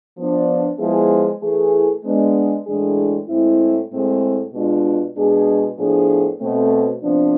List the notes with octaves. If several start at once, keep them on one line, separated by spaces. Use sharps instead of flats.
F3 B3 D4
F3 G#3 B3 E4 G#4
E3 A3 E4 G#4
G#3 B3 D4
A2 E3 G#3 D4 G#4
A2 G#3 C4 E4
A2 G#3 C4 G#4
B2 G#3 D4 F4
B2 G#3 D4 G#4
A2 F3 B3 D4 G#4
B2 A3 C4
C3 F3 B3 D4